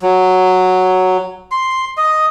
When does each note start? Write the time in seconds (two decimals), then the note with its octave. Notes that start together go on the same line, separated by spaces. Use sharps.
0.02 F#3
1.51 C6
1.97 D#5